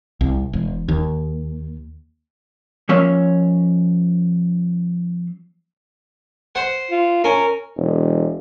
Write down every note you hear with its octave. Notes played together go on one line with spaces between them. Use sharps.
C2
E1
D#2
F3 A#3 C#4 C#5 E5 F5
C5 F#5
F4
C#4 A#4
E1